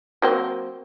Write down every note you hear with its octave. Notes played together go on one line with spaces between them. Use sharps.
F#3 A#3 C4